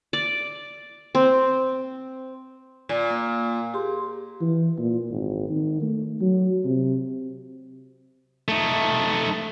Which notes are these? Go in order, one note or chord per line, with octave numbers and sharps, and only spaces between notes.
D5
C4
A#2
A#3
G4 G#4 C6
E3
A#2
G#1
D#3
A3
F#3
C3
A3 D#4